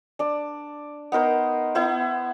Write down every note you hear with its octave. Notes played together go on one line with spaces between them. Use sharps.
D4 D5
B3 D#4 A#4 C5
B3 E4 C5